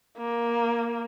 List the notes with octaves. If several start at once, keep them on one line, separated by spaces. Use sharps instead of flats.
A#3